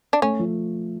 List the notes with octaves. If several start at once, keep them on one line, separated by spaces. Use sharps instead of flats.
D4
A3 C#4
F3